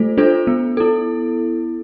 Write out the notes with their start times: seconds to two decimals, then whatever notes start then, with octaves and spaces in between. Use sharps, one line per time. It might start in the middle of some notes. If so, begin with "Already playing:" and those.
Already playing: A3 F4 A4 C5
0.17 D4 F4 A4 C5
0.47 B3
0.77 E4 A4